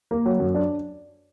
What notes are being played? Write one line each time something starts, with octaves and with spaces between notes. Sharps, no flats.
A#3
F#3
F#2
D4